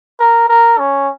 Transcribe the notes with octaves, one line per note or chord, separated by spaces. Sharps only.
A#4
A#4
C#4